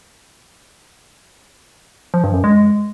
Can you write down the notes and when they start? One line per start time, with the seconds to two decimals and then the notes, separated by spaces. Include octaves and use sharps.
2.14 F3
2.24 G2
2.34 F#2
2.44 G#3